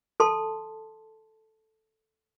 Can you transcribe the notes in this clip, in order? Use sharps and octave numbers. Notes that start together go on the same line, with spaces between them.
A4 A5 C6